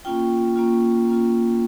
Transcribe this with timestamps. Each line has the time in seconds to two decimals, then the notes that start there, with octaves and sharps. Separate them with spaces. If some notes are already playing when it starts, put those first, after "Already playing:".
0.05 A#3 C#4 F4 G5
0.56 A#3 C#4 F4
1.08 A#3 C#4 F4